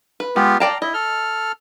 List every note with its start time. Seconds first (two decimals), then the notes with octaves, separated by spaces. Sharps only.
0.20 B4
0.36 G#3 B3 F4 G4
0.60 D5 F5 G5 A5 A#5
0.82 E4 D#5
0.94 A4 F6